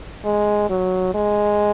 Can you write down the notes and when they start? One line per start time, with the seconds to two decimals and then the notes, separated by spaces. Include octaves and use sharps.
0.25 G#3
0.70 F#3
1.14 G#3